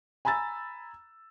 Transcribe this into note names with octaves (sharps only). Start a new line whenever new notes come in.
G#5 A#5 B5 E6 A6